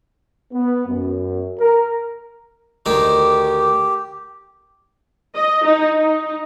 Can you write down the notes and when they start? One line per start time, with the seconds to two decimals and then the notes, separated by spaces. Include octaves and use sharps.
0.53 B3
0.88 F#2
1.60 A#4
2.86 D2 D#3 D#4 G4
5.35 D#5
5.65 D#4
5.97 D#4